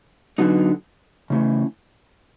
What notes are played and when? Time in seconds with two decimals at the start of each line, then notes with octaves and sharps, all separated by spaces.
0.38 D3 F#3 B3 D#4 F#4
1.30 C#3 E3 A3 C#4